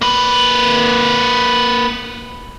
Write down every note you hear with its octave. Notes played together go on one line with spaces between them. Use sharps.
A#3 B4